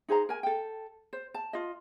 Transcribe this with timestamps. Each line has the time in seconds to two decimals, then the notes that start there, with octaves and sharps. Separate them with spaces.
0.08 D#4 G#4 C5 A#5
0.29 A#4 G#5
0.43 A4 G5
1.13 C5
1.34 A5
1.53 F4 D#5